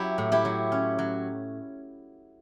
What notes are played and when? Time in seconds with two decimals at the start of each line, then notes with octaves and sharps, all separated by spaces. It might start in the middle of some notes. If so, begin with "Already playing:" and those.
Already playing: F#3 E4 G4
0.18 A2
0.32 E4 G4
0.45 F#3
0.72 C#4
0.99 F#3